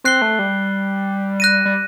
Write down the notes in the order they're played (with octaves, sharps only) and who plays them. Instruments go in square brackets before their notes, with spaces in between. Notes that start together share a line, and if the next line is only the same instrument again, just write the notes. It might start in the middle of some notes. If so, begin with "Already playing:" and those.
[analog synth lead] C4 [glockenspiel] F#6 C7 G7
[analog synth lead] A3
G3
[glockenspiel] F#6 A#6 D#7
[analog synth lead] G3